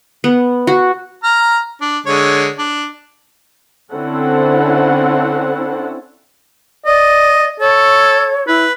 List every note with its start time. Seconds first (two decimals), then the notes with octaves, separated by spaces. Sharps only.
0.24 B3
0.67 F#4
1.24 A#5 F6
1.81 D4
2.06 D3 G#3 C#5
2.58 D4
3.93 D3 C4 C#4 E4 A4 F#5
6.86 D5 D#5
7.60 A4 C#5
8.47 E4 B4